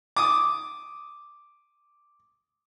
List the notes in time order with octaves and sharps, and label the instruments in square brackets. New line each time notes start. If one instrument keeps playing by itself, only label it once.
[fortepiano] D6 D#6